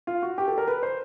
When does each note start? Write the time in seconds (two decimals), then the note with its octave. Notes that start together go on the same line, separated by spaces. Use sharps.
0.07 F4
0.22 F#4
0.38 G4
0.48 A4
0.58 A#4
0.68 B4
0.83 C5